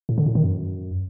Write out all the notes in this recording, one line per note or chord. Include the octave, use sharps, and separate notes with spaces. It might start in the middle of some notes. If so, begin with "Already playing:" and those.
A2
D3
A2
D#3
F#2